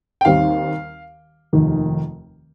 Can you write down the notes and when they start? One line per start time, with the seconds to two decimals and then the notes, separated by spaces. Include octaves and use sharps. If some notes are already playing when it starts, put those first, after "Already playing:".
0.21 G5
0.25 D#2 D#3 G3 C4 F5
1.53 F1 D#2 D#3